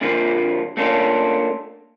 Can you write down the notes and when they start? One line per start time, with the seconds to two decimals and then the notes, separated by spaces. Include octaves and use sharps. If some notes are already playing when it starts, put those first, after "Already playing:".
0.01 A#2 D3 F3 A#3 F4
0.77 A3 A#3 C#4 D4 F4